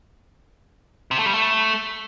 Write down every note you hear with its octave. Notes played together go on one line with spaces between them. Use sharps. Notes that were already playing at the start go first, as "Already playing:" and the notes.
C3
A3
G3
A3